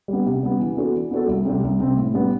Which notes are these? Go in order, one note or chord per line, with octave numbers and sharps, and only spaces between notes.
G3 B3
C3
G3 B3
E3
B3 D4 F#4 A4
E3
B3 D4 F#4 A4
C2
C3 G3 C4
C2
C3 G3 C4
A2
G3 B3 D4